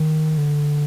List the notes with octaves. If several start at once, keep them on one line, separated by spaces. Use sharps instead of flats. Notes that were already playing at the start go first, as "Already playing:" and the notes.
Already playing: D#3
D3